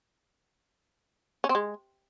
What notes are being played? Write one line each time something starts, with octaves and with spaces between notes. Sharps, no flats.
C#4
C4
G#3